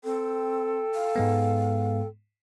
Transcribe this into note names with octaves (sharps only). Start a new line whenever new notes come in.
C4 A4 G5
F5
G#2 G#3 B3